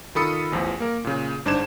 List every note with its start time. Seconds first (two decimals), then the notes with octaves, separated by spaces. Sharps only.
0.15 D#3 F4 A4 B5 D#6 C#7
0.52 A1 E2 F3
0.80 A#3 A#4
1.04 A#2 C#3
1.45 G1 G#2 D4 C5 G#6 E7